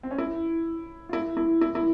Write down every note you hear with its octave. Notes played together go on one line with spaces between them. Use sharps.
C4
C#4
E4
F4
E4
E4
E4
E4